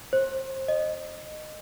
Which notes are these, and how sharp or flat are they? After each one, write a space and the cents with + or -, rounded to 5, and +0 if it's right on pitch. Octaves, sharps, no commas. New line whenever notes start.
C5 +25
D#5 -15